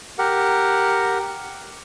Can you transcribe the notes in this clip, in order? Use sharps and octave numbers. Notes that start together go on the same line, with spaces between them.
G4 A#4 F#5